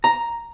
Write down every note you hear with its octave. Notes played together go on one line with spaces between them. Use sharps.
A#5